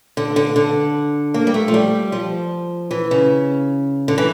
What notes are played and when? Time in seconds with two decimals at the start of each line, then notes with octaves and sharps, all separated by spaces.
0.17 D3
0.36 D3
0.56 D3
1.34 A#3
1.47 G3
1.54 A3
1.68 F3
1.74 G3
2.12 F3
2.91 E3
3.11 C#3
4.08 D3
4.18 E3